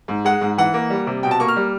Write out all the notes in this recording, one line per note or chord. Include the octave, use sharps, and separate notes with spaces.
G#2
G#3 F#5
G#2
E3 F#5
A#3
G3
C3
B2 G5
A5
A#3 C#6
F6
G3